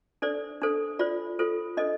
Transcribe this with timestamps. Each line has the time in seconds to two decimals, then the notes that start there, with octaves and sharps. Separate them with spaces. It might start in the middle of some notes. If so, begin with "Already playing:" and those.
0.22 D4 A4 C5 D5
0.62 D4 A4 C5
0.99 F4 C5 D5
1.39 F4 A4 C5
1.77 D4 A4 C5 D#5